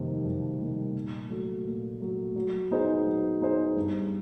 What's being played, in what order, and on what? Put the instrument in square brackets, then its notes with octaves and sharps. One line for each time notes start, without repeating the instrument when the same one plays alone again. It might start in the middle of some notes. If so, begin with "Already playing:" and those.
Already playing: [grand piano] F2 C3 D#3 G3 A#3
F2
C3 D#3 G3 A#3
A#2
F#3 A3
A#2
F#3 A3
F#3
B3 D#4 G#4 C5
F#3
B3 D#4 G#4 C5
G2